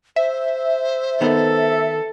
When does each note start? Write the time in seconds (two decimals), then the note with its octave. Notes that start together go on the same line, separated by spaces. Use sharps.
0.16 C5 E5
1.21 D#3 B3 A4